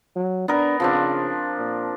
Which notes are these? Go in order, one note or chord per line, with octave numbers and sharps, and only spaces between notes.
F#3
B3 D4 A#4
C#3 F3 C4 D4
A#2